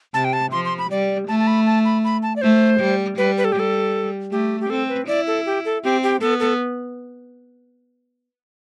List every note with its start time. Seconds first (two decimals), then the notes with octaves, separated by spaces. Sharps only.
0.14 C3 A5
0.25 G5
0.33 A5
0.52 F3 C6
0.65 C6
0.78 B5
0.90 G3 D5
1.28 A3 A5
1.40 A5
1.47 B5
1.66 A5
1.85 B5
2.04 B5
2.23 A5
2.36 D5
2.42 A3 C5
2.80 G3
3.18 G3 B4
3.37 B4
3.44 A4
3.52 G4
3.56 G3 A4
4.32 A3 G4
4.60 G4
4.70 C4 A4
4.89 B4
5.07 E4 D5
5.27 A4
5.46 G4
5.65 A4
5.84 C4 G4
6.03 G4
6.21 B3 A4
6.40 A4